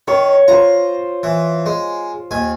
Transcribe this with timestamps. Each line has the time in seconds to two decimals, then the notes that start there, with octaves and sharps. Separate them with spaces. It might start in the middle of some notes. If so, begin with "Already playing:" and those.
0.08 D#3 C#5
0.48 F4 C5 A#5
1.23 E3
1.66 G#3
2.31 D#2 G#5